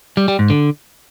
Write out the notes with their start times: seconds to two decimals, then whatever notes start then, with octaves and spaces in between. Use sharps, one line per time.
0.17 G3
0.28 G3
0.39 G#2
0.50 D3